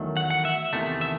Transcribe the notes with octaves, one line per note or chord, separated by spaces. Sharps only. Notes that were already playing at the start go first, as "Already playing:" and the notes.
Already playing: E2 D#3 F#3 A3
F#5
F#5
E5
E2 C3 D#3 A3
E5